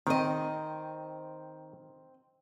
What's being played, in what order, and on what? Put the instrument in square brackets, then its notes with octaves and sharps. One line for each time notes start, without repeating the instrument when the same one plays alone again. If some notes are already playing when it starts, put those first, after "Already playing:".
[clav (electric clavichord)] D#3 [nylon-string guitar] C4 D#5